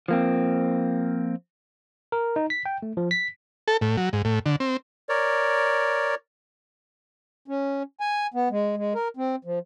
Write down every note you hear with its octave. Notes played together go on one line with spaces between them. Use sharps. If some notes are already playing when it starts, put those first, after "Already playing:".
F3 A#3 C4
A#4
D#4
B6
G5
A3
F3
B6
A4
A2
F#3
G#2
A2
D3
C4
A#4 C#5 D5
C#4
G#5
B3
G#3
G#3
A#4
C4
F3